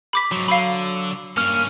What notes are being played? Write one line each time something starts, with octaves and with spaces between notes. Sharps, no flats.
B5 D6 B6
G#2 F3 F#3
D3 F5 B5
G2 A#3 C#4 F6